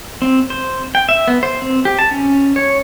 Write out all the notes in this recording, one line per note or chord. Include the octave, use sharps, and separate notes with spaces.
C4
C5
G5
E5
B3
C5
C4
G4
A5
C#4
C#5